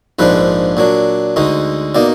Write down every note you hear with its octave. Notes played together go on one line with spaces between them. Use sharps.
A#1 G#2 F3 G#3 D4 B4
A#2 F#3 D4
D2 D3 G#3 D#4
B2 A#3 D#4 D5